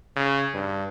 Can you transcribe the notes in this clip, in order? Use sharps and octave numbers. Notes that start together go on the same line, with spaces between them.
C#3
G2